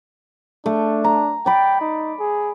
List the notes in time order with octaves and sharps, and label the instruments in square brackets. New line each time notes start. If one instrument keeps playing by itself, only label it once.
[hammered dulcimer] A3 [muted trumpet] D4
[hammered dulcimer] A#5
[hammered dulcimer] D5 B5 [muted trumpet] G5
[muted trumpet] D#4
G#4